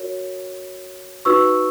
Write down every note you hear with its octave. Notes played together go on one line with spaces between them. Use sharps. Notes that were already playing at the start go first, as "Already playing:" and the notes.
Already playing: F#4 A#4 C#5
D#4 F#4 B4 C#6 E6